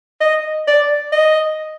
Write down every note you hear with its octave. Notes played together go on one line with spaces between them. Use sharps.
D#5
D5
D#5